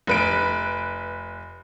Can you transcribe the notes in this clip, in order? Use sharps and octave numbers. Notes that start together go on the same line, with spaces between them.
F1 B4 D7